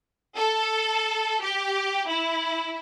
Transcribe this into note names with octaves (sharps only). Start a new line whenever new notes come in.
A4
G4
E4